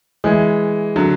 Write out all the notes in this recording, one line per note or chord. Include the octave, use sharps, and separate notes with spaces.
E3 G#3
D3 F#3